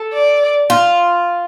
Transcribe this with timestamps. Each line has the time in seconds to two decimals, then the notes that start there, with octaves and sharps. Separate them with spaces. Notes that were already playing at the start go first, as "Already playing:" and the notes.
Already playing: A4
0.13 D5
0.70 F4